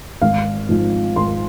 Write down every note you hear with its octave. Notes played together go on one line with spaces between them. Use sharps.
G#1 F5
G#2 F3
G#1 C6